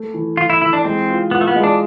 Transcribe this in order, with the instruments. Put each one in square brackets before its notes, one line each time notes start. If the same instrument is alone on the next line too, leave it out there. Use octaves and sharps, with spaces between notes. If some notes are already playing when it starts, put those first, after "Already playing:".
Already playing: [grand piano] A3
E3
[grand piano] E3 [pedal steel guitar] F4
[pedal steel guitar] E4
[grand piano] E3 [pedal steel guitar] E4
[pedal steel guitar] D4
[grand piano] G#3 [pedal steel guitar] C4
[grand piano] F4
[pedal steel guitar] B3 [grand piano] F4
[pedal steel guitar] A3
B3
[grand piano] G#3
[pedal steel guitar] D4